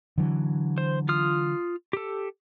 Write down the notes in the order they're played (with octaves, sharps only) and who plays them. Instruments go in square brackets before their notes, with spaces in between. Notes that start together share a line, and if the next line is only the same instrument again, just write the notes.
[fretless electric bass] D3 E3 F#3
[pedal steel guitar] C5
F4 D#6 F6
G4 A4